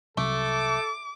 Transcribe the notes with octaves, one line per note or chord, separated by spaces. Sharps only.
C2 C3 F#3 A3 A4 D6